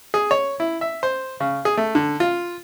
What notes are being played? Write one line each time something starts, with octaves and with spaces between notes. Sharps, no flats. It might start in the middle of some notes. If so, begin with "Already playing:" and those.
G#4
C#5
E4
E5
C5
C#3
G#4
A3
D3
F4